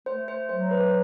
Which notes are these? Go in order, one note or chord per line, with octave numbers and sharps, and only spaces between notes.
A3 C5
C5
F#3 C5
B4